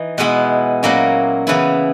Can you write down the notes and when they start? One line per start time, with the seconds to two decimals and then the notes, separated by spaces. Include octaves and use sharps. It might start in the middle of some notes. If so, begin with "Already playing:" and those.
Already playing: E3 D#4
0.18 B2 G#3 B3 E4
0.83 A#2 F#3 A#3 C#4 E4
1.47 C#3 E3 B3 E4